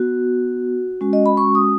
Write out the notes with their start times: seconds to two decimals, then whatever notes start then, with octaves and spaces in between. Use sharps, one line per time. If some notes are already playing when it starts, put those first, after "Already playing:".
Already playing: B3 F#4
1.01 G#3 C#4 F#4
1.13 D#5
1.26 B5
1.37 C#6
1.55 D#6